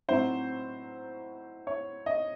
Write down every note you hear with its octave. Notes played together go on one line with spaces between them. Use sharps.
A2 F#3 C4 D#4 C5
C#5
D#5